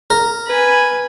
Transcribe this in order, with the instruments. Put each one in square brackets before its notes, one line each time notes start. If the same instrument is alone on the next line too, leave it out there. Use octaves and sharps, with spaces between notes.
[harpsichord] A#4
[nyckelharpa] B4 G#5